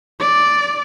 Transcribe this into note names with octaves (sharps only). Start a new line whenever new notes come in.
D5